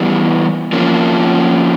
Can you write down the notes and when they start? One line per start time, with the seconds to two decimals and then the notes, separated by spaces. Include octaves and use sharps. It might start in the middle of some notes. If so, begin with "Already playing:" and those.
Already playing: E3 G3 B3
0.73 F3 A#3 C#4